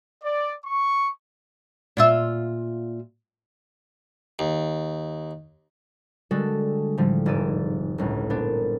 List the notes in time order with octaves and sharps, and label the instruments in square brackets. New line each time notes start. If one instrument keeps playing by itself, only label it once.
[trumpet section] D5
C#6
[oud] A#2 F4 E5
[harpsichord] D#2
[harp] D3 G3 G#3 F#4 A4
A2 D3 F3 G3
F1 G#2 G#4 D5 E5 D#7
G1 C#2 A2
A#2 B3 C4 D4